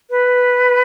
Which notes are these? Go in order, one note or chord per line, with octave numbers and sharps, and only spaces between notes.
B4